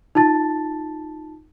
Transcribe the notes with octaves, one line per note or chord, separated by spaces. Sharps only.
D#4 F4 A5 A6